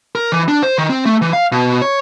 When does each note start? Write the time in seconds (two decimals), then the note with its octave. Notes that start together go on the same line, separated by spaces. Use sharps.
0.15 A#4
0.32 E3
0.48 D4
0.62 C5
0.78 D#3
0.90 C4
1.05 A3
1.22 E3
1.33 F5
1.52 B2
1.82 C#5